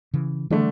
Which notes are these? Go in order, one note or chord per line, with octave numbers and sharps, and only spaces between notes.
C#3 E3
D3 E3 G3 A3 D4